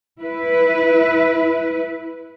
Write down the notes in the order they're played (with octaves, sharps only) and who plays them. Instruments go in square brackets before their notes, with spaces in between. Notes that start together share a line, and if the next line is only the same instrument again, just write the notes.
[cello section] E4 B4